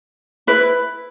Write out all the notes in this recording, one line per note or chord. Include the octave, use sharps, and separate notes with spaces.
E4 B4